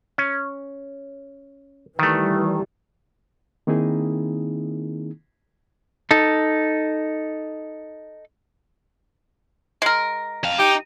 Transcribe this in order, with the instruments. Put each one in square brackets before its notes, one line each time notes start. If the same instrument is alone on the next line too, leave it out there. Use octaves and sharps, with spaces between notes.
[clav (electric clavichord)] C#4
[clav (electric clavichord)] D#3 A3 [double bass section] E3 G3
[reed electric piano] D#3 A#3 C4 D#4 E4 G#4
[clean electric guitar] D#4 A4
[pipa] G#3 A#4
[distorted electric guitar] F2 F5
[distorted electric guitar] D#4 [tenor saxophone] G4